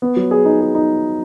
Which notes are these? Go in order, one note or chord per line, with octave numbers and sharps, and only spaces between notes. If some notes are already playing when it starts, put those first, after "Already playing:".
B3
F#3
G#4
D#4
G#4
D#4